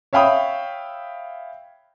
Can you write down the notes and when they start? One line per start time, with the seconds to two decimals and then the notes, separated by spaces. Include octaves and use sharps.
0.13 C#5 E5 F5 G5 B5 D#6